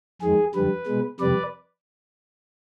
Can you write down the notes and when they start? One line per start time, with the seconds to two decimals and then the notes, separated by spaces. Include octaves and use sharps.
0.22 F2 D#3 G#3 G#4
0.54 F2 D3 G3 B4
0.87 B2 G#3
1.20 F2 C3 G3 B4 D5